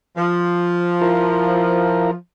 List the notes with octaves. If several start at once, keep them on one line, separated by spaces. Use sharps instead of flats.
F3
E4 F4 A#4